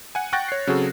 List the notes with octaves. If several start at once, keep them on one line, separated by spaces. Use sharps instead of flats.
F#5 G#5
F#5 G5 C#6 F#6 A6 A#6
C#5 C7
C#3 F#3 C4 F#4 G#4 A4